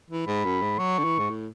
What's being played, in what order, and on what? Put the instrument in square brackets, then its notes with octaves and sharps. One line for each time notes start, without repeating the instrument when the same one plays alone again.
[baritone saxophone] E3
[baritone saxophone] G#2 [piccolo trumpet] B5
[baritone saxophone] F#2
G#2
[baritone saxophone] F#3 [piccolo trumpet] C#6
[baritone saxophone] D3
E3
G#2
A2